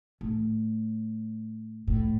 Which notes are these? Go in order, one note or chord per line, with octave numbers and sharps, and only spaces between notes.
A2
A2